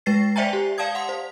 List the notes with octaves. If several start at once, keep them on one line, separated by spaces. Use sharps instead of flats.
G#3 B4 A6 C7
C5 D5 E5 G5 G#5 A#5
G4
D5 F5 A5 D#6 G#6
F#5 C6 D#6
C5